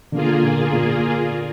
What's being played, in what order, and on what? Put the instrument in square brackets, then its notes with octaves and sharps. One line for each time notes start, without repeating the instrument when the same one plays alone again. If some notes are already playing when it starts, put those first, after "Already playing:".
[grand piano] D3 [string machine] A#3 F4 G#4
[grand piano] A#2
A#2